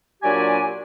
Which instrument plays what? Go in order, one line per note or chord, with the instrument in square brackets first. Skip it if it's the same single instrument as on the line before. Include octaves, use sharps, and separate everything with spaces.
[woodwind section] A#2 F#3 D4 G4 D5 G#5